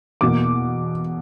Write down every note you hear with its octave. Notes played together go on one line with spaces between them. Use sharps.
E2 B2 A#3 D6